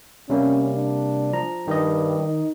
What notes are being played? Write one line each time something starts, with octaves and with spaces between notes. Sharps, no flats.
C3 G3 A#3 C#4
D4
F3 A#5
G2 D#3 D#5
D#4